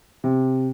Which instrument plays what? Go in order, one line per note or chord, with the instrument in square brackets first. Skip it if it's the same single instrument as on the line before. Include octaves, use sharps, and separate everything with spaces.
[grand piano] C3